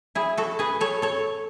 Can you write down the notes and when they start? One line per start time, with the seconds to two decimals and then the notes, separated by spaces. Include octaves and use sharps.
0.15 E4 G#4
0.37 F#4 A4
0.59 G#4 B4
0.80 A4 C#5
1.02 A4 C#5